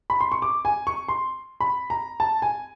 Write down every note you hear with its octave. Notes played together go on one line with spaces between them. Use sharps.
B5
C6
C#6
D6
G#5
C#6
C6
B5
A#5
A5
G#5